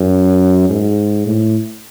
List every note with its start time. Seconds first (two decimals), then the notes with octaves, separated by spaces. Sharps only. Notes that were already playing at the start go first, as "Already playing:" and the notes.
Already playing: F#2
0.69 G#2
1.27 A2